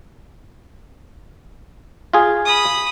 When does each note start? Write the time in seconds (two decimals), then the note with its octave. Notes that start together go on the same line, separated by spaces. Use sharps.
2.13 F4 G#4
2.45 B5 D#6